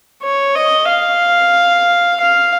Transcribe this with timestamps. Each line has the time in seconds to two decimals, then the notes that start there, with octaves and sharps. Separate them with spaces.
0.23 C#5
0.56 D#5
0.88 F5
2.20 F5